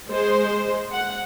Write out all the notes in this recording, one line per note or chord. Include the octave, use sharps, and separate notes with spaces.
G#3 C5
F#5